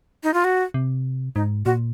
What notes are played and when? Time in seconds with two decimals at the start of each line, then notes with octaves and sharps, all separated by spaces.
0.23 D#4
0.34 F4
0.44 F#4
0.74 C3
1.35 G#2 D#4
1.65 A#2 F#4